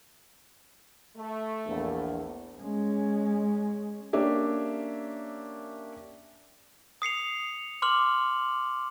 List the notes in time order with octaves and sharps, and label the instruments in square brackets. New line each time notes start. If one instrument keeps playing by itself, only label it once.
[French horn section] A3
[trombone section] A#1 E2
[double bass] G#3 C#4
[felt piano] A#3 C#4 D4 G4 E5
[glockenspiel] D#6 C7 C#7 F7
C6 D6 F6 F#7